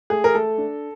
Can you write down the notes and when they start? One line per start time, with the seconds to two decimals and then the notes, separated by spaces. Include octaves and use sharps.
0.10 A3 G#4
0.24 A#4
0.34 A3 A4
0.58 D4